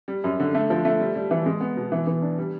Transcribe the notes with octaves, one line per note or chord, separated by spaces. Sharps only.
G3
F#2
D3
A3
F3
A3
G3
G3
E3
G#3
B3
B2
E3
E3
D4
G3